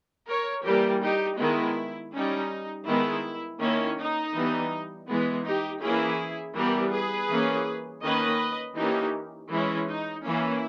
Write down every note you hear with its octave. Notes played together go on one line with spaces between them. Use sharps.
A#4 C#5
E3 G3 A#3 G4 A#4
D#4 G4
D#3 G#3 B3 E4
G3 C#4 D#4
D#3 G#3 B3 E4
D#3 A#3 C#4 E4
D#4
E3 G3 B3
E3 G#3 B3
D#4 G4
E3 A#3 C#4 E4 G#4
E3 G3 B3 G4 A#4
G#4 B4
E3 A#3 C#4
D#3 A#3 C#4 B4 D#5
E3 A#3 C#4 D#4 G4
E3 G#3 C#4 E4
D#4
E3 A#3 C#4 E4